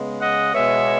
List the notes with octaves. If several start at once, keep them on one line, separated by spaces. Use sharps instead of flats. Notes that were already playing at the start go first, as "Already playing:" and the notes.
Already playing: C#3 G#3 B3
D#5 F#5
B2 G#3 B3 C#5 E5